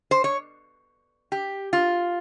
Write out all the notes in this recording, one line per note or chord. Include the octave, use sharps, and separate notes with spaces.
C5
C#5
G4
F4